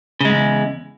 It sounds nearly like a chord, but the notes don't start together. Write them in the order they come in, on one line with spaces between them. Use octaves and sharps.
C#3 G#3 G#2 E2